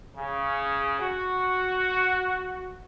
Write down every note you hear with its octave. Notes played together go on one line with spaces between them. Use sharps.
C#3
F#4